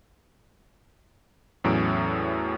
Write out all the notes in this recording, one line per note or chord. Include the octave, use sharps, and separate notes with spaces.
E2 A2 F#3 C#4 D7